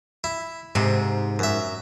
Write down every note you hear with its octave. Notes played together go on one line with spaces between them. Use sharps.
E4
G#2 C3
F#2 E5